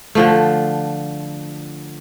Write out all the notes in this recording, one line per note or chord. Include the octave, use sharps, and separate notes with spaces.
D3 F3 A3